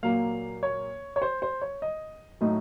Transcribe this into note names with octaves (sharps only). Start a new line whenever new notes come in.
A#2 F#3 A#3 F5
C#5
C#5
C5
C5
C#5
D#5
A2 F#3 A3 D#4 D#5